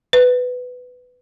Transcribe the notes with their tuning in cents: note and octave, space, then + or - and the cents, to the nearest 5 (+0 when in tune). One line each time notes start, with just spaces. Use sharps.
B4 +10